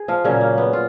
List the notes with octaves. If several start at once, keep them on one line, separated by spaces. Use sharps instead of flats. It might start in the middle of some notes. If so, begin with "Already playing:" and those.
Already playing: G#4
F3 F4
A#2 C#3 F#3 A#3 C#4
A#3
B3
F4